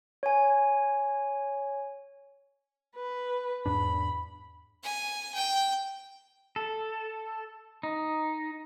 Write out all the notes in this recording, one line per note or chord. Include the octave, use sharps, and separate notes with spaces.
C#5 G#5
B4
E2 G#2 D4 B5
G#5
G5
A4
D#4